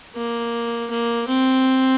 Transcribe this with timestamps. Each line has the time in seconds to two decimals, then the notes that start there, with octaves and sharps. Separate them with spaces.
0.15 A#3
0.90 A#3
1.28 C4